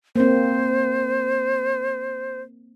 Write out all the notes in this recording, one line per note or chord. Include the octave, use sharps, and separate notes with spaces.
A#3 C4 C5